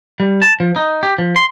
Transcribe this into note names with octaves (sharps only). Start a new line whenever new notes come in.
G3
A5
F3
D#4
G4
F3
C6